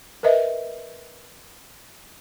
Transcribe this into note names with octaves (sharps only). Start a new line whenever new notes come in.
A#4 B4 D#5 E5